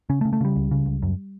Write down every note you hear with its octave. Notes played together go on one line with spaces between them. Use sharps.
C#3 C#4
A3
C#3
A3
C#3 G3
C#2
C#3
C#2
F#2